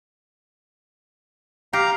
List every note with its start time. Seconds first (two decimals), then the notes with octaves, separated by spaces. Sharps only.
1.73 G4 F5 A#5